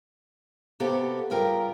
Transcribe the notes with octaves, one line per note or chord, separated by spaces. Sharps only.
C3 A#3 B3 F#4 G4 A4
G2 C#3 F4 A#4 G5 A#5